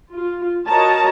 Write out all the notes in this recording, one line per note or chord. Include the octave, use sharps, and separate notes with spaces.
F4
F#4 A#4 C#5 D#5 A5 A#5